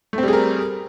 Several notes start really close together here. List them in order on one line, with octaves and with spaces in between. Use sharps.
A3 C4 G3 G#4 A#4